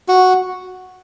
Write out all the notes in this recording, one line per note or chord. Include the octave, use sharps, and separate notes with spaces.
F#4